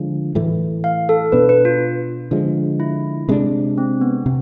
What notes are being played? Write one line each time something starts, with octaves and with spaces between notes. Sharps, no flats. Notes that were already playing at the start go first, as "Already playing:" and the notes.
Already playing: D3 F3 G#3
A2 E3 A3
F5
A4
B2 B3 D4 B4
B4
F4
D3 F3 G#3
E4
C3 G#3 D4
C4
B3
C3